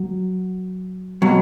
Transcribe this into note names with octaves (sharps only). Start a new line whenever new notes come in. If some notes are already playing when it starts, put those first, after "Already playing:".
Already playing: F#3
B2 F#3